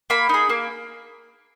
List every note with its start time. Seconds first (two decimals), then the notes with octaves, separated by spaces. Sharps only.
0.10 A#3 B5
0.29 D#4 G#4
0.49 A#3